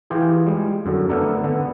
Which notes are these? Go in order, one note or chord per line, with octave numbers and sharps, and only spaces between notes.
E3 F4 G4 G#4
G3 G#3
F#2 D3
A3 B3 D4 A4 A#4
D3 B3